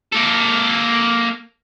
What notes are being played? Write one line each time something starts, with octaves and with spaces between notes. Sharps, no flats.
A#3 A4